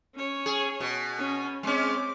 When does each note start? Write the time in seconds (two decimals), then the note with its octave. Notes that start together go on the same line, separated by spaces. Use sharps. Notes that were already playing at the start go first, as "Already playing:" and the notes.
0.15 C#4 C#5
0.46 G#4
0.80 B2
1.18 C#4
1.63 G#3 C4 C#4 D6